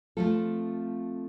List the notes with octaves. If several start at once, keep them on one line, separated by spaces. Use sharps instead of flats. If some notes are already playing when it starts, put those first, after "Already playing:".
F3 A3 C4 F4 A4